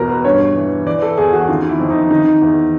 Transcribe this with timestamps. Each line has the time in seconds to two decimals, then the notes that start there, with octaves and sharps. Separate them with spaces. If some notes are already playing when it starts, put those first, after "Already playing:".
Already playing: E2 B2 F#4 A#4
0.09 B4
0.24 G2 C#5
0.55 E3
0.86 E3 D5
1.02 A4
1.17 E2 G#4
1.33 F#4
1.48 D#3 F4
1.69 E4
1.79 F2
1.90 D#4
2.10 D#3 D#4
2.42 E2